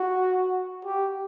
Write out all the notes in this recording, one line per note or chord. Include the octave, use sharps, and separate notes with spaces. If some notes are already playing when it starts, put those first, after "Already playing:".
Already playing: F#4
G4